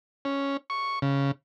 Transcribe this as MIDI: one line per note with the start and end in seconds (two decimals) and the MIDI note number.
0.25 0.57 61
0.70 0.99 85
1.02 1.31 49